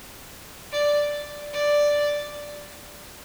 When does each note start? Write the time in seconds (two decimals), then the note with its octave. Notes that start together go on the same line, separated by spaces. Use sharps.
0.72 D5
1.53 D5